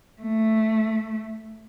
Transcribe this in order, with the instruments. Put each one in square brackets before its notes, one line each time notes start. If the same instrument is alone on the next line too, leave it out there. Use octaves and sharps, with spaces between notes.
[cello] A3